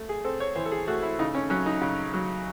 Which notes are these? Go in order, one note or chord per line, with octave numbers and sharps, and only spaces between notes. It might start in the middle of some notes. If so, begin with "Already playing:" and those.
Already playing: A3
G#4
C4 A4
C#5
E3 C5
A4
G#4
A3 F#4
E4
C#3 D#4
C#4
F#3 C#4
D#4
C#3
F#3